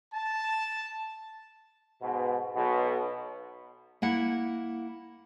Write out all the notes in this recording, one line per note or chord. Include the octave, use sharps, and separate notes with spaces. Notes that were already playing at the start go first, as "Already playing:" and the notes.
A5
G#2 B2
B1 B2
A#3 E4 F#5